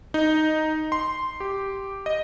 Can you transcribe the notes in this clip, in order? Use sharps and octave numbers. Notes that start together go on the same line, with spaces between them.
D#4
C6
G4
D#5